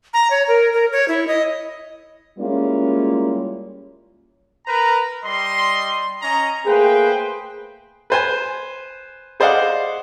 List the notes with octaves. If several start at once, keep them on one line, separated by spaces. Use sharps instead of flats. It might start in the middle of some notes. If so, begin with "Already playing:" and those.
A#5
C#5
A#4
A#4
C#5
E4
D#5
G3 G#3 A#3 C#4 E4 F4
A#4 B4 A#5
G3 D#5 C6
C#4 D#5 A#5
A3 A#3 G#4 B4 C5 G5
B4 C5 G#5
G#4 C5 D5 D#5 F5 F#5